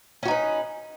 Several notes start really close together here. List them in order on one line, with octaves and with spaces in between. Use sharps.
C#4 F#4 D#4 B4